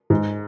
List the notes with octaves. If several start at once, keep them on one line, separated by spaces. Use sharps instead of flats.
G#2